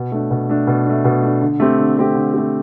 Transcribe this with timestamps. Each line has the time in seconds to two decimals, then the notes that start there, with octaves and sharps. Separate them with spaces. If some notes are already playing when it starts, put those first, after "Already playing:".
Already playing: B2
0.12 A3 D4
0.31 B2
0.49 A3 D4
0.67 B2
0.86 A3 D4
1.04 B2
1.23 A3 D4
1.42 D3
1.60 A3 C4 G4
1.78 D3
1.97 A3 C4 G4
2.15 D3
2.34 A3 C4 G4